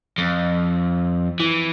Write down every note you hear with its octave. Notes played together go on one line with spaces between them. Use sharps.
F2
E3